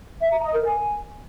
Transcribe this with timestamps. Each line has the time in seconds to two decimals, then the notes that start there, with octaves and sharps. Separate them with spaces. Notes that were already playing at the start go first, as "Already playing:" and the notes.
0.20 E5
0.31 A#5
0.42 D#5
0.53 A#4
0.64 G#5